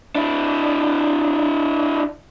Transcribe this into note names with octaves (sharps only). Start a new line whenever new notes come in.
D4 E4